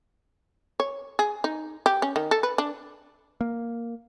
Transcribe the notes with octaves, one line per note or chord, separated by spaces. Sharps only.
C#5
G#4
D#4
G4
C#4
D#3
A4
B4
D4
A#3